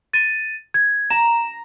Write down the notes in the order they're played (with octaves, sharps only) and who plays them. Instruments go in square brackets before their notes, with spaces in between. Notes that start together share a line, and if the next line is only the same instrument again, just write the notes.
[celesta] A6 D#7
G#6
[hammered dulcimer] A#5 [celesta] E7